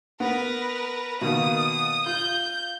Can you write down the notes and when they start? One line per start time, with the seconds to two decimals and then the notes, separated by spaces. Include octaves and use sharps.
0.20 B3 A#4 B4
1.21 B2 D#3 A#3 D#6
2.06 F4 G6